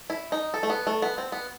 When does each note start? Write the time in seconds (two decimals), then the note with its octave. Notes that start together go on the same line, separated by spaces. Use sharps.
0.10 E4
0.32 D#4
0.54 A4
0.63 A3
0.70 B3
0.87 A3
1.02 B3
1.18 C4
1.32 B3